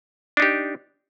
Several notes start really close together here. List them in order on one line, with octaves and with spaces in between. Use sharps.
D4 D#4 G4